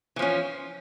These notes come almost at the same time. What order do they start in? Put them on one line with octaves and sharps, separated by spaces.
E3 F3 C#4